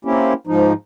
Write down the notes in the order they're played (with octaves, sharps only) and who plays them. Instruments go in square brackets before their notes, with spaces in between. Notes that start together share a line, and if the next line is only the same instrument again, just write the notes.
[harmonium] A#3 C4 C#4 E4 G4
G#2 F3 D#4